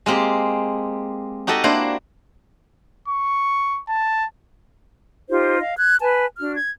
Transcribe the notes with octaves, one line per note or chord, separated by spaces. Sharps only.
G#3 A#3 C4 G4
D#4 F#4 G4 A4 D#5
A#3 D4 E4 C5
C#6
A5
D#4 F4 G4 C5
D#5 F5
F#6 G#6
B4 G#5 A5
D4 F#4 F6
G#6